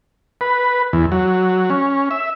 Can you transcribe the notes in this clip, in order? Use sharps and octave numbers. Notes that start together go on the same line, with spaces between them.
B4
E2
F#3
C#4
E5